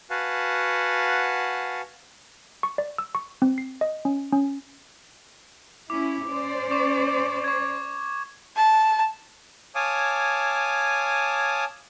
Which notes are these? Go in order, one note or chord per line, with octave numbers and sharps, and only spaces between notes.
F#4 B4 F5 F#5 G#5 A5
C#6
D5
E6
C#6
C4
C7
D#5
C#4
C#4
C#4 E4 D6
C#4 C5 D5
C#6 D6
C#6 G#6
A5
C#5 F5 G#5 A5 D6 D#6